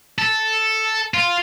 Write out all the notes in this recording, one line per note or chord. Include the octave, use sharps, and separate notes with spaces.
A4
F4